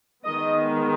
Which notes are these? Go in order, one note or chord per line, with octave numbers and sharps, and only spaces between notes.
D#3 G#3 B3 D#5